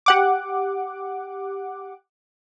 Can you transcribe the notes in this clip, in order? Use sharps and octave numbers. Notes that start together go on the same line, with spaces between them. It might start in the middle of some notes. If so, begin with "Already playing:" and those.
G4 F#5 D6